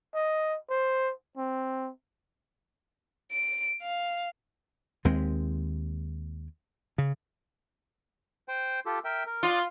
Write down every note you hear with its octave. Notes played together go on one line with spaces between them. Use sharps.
D#5
C5
C4
D7
F5
D#2 G#3 C4
C#3
C5 G5
F4 G4 A4
A#4 E5 G5
A#4
F4 D5 D#6 F#6